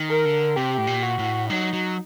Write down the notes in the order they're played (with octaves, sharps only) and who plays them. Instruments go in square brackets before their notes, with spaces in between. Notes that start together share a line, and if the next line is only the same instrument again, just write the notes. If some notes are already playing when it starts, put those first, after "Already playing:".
Already playing: [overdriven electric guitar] D#3
[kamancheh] A#4
[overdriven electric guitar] D3
[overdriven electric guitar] C3 [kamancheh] G4
[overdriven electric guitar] A2
A#2
[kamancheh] F#4
[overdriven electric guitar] A2
[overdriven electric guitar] F#3 [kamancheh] D#4
[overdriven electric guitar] F#3